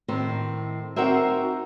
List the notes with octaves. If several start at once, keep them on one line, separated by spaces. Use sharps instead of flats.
A2 D#3 C4
C4 D#4 F#4 A#4 C5 E5